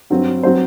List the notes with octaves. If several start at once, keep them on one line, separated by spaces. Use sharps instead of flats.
G2 F#3 C4
F#3 C4 C5